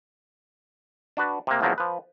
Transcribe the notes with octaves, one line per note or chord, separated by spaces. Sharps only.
D4 F#4 B4
C3 A#3
E2 C#3 F3 F#3 A#3
F3 B4